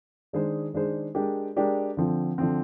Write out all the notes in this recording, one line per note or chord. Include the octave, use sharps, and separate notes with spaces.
D#3 G#3 D4 G#4 C5
D#3 G#3 D4 G#4 C5
G#3 D4 G4 A#4 D5
G#3 D4 G4 A#4 D5
D3 F3 C4
D3 F3 C4